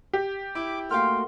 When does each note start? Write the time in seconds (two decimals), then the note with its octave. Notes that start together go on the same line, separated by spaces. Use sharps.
0.13 G4
0.55 E4 D6
0.91 A3 A#3 F#4 F5 G5 C6 F6